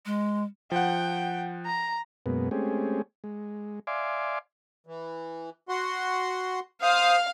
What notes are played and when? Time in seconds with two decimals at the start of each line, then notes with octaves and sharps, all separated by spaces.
0.06 G#3
0.72 F3 F#5 G5
1.66 A#5
2.26 F#2 B2 G#3 A#3 B3
2.51 G#3 A3 C4 C#4 G4 G#4
3.24 G#3
3.87 D5 E5 F5 G#5 C6 D6
4.87 E3
5.69 F#4 F#5 C6
6.82 C5 F5 D#6